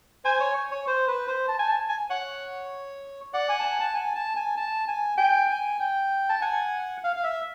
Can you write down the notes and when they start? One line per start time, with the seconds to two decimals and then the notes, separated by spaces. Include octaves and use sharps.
0.25 C5 G#5
0.40 C#5
0.71 C#5
0.87 C5
1.08 B4
1.28 C5
1.48 A5
1.59 G#5
1.69 A5
1.89 G#5
2.10 C#5 F#5
3.33 D5 F#5
3.49 G#5
3.60 A5
3.64 G#5
3.80 A5
3.94 G#5
4.15 A5
4.36 G#5
4.57 A5
4.88 G#5
5.18 G5 G#5
5.49 G#5
5.80 G5
6.29 A5
6.41 F#5 G#5
7.04 F5
7.16 F5
7.23 E5